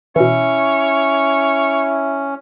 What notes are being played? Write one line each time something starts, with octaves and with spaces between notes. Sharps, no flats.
B2 E3 C#4 E4 C#5